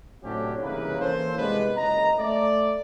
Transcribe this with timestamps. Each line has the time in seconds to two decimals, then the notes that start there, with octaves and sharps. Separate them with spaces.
0.24 A2 C3 F#3 C#4 D4 G4
0.62 C2 C#3 E3 A#3 D#4 B4
1.00 E3 A#3 C#4 A4 C5
1.38 C2 D#3 G#3 B3 D4 B4
1.76 F#1 C#2 D#5 A#5
2.18 A3 D5